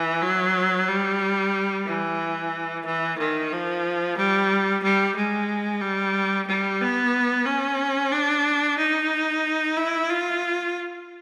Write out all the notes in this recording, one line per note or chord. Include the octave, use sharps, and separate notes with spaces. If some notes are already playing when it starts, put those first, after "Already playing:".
Already playing: E3
F#3
G3
E3
E3
D#3
F3
G3
G3
G#3
G3
G3
B3
C#4
D4
D#4
E4
F4